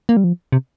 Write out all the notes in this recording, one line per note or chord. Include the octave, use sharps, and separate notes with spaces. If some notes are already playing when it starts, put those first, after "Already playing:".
A#3
G3
F3
C3